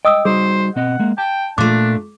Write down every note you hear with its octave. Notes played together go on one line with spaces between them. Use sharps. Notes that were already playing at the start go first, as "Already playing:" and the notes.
D#5 G5 D#6 E6
G3 D#4 F#4 G#4 C5
B2 C4 D#5 F#5
G#3 A#3
G5 A5
A#2 A3 D4 D6